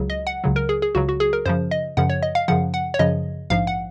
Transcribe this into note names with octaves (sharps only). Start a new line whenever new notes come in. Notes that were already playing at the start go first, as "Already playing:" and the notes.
Already playing: C#2 C#3 F#3
D#5
F#5
C#2 C#3 F#3
A#4
G#4
G#4
C#2 C#3 F#3 F#4
F#4
G#4
A#4
F#2 C#3 F3 C5
D#5
F#2 C#3 F3 F#5
C#5
D#5
F5
F#2 C#3 F3 F#5
F#5
C#5
F#2 C#3 F3 D#5
A#1 G#2 F3 F5
F#5